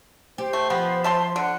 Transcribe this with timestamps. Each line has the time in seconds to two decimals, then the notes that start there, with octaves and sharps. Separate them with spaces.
0.38 G4 C5
0.53 A3
0.70 F3 B3
1.04 E5 A5 C6
1.36 D3 F#5